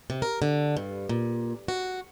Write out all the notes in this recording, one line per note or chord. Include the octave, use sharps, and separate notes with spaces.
C3
A#4
D3
G2
A#2
F#4